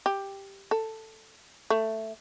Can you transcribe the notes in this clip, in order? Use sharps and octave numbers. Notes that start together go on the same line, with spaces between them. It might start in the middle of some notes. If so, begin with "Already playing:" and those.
G4
A4
A3